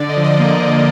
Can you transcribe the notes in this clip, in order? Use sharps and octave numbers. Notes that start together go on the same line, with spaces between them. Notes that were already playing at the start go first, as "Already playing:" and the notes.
Already playing: D3 D5
D#5
F3
D#5
A#3
D3